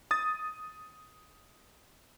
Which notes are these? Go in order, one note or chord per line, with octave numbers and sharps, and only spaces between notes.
D#6 A6